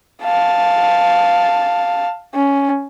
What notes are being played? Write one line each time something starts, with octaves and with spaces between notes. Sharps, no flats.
F5 A5
C#4